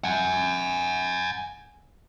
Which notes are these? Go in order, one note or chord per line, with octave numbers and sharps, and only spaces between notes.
F#5 G#5